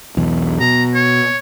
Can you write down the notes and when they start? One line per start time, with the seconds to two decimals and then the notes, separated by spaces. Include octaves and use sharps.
0.17 B1 E2
0.60 B2 A#5
0.94 C#5